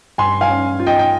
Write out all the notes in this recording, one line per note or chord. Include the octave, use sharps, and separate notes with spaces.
G2 G#5 C6
F5 G#5
C#4
F4
D#5 G5
G5